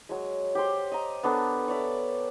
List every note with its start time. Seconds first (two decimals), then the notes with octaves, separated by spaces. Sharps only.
0.09 F#3 G#3
0.55 G4 C5 C6
0.92 D#5 A#5
1.23 B3 D4 A4 A#4
1.68 C#5 D5 E5